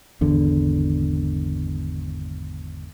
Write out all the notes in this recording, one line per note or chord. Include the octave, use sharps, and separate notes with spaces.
G#1 E2 D3